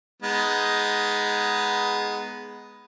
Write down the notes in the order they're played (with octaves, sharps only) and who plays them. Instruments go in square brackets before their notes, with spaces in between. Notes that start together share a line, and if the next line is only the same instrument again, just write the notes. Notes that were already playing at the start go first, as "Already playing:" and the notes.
[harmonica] G#3 B3 D#4